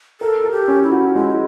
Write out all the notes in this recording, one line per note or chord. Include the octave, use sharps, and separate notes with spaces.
A4 A#4
A#4
G4
C#4
E4
F#4
G#3 E4